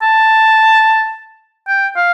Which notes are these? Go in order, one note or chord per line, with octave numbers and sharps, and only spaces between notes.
A5
G5
F5